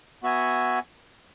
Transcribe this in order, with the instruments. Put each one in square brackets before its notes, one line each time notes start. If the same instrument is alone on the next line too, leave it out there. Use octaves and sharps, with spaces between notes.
[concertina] B3 F#4 E5 G#5